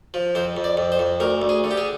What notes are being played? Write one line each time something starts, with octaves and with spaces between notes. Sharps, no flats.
F3
F2 C5
F2
D5
F2
C5
F2
D2 A#4
D2
G#4
D3
G4
G#4